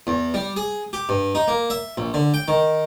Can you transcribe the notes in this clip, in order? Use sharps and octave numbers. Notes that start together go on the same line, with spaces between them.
E2
G3
G#4
G4
G2
D#4
A#3
E5
A#1
D3
G5
D#3